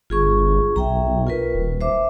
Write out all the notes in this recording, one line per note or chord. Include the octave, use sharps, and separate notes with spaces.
G1 F4 G#4 C#6
B1 E5 G5 A#5
F4 A#4 B4
D#1
C5 E5 D6